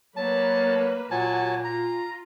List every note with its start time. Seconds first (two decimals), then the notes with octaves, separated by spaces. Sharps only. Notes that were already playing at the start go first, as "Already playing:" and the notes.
0.17 F#3 A#3 B4 A5
1.11 A#2 F#3 F#4 G#5 A5
1.65 F4 A#5